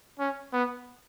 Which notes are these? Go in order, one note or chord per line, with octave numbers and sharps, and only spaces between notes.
C#4
B3